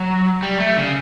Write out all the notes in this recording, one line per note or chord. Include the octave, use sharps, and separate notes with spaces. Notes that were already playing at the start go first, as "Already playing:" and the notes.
Already playing: F#3
G3
A3
C#3